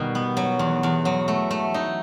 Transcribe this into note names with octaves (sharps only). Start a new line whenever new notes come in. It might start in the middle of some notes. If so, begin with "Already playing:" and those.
Already playing: B2 D#3 G3
B3
F#3
E2
E2
F#3
A3
A3
D#4